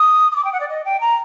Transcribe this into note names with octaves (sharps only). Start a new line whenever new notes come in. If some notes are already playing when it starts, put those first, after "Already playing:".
Already playing: D#6
D#6
D6
G5
F#5
D5
D#5
G5
A#5